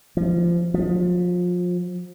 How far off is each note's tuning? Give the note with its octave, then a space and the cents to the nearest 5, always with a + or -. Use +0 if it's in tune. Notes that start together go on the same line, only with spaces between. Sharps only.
F3 -20
F3 +30